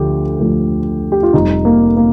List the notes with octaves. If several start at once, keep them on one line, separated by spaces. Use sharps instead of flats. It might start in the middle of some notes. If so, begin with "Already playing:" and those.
Already playing: D2 D3 F3 A3 G4
D2 D3 F3 A3
G4
F4
F1 F2 C3 G3 D#4
A#3
A#3